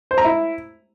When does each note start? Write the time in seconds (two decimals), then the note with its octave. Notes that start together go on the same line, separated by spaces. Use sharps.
0.11 C5
0.18 A#5
0.24 E4